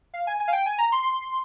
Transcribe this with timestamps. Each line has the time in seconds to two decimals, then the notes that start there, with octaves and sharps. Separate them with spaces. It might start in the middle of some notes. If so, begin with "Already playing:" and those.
0.14 F5
0.27 G#5
0.40 G#5
0.48 F5
0.53 G5
0.66 G#5
0.78 A#5
0.92 C6